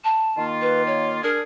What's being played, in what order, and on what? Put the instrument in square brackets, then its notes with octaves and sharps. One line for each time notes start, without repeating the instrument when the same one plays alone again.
[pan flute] A5
[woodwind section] D#3 A#3 F4
[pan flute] B4
C#5
[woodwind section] D4 G#4 [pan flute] A#4